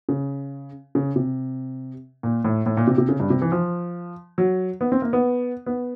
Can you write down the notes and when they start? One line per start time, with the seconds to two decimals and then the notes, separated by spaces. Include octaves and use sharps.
0.09 C#3
0.95 C#3
1.16 C3
2.23 A#2
2.45 A2
2.66 A2
2.77 A#2
2.87 C3
2.98 C3
3.09 C#3
3.20 G2
3.30 C3
3.42 E3
3.52 F3
4.38 F#3
4.81 B3
4.92 C4
5.02 A#3
5.13 B3
5.66 B3